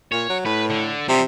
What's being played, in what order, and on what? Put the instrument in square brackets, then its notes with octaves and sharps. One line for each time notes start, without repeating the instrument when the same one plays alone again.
[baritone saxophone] A#2 [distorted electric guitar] C#5
[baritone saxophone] F#3
[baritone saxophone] A2 [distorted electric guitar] B4
[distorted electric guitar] D3
[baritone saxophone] C3 [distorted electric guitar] F3 G3